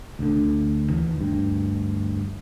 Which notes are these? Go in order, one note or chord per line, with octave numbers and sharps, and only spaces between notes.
D2 D3
D#2 D#3 E3
D2 G2